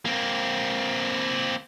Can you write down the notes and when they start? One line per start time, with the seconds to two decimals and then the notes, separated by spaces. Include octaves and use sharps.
0.05 A#3 C4